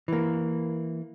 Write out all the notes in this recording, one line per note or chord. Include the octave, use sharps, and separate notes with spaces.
E3 A#3